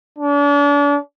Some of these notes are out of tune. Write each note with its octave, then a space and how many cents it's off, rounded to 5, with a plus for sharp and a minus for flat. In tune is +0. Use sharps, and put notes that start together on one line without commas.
D4 -40